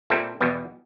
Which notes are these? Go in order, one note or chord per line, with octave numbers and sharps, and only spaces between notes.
A#2 G3 C4 E4 A4
E2 B2 G3 B3